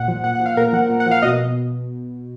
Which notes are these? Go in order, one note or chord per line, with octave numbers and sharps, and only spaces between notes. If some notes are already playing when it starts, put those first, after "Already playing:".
Already playing: A#2 F#5
F3
A#2 F#5
F3 F#5
F5
A#2 A#4
F3 F#5
A#2
F#5
F3
F5
B2 D#5